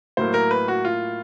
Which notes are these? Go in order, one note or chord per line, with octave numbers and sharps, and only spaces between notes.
A2 F#3 A#3 C5
A#4
B4
F#4
F4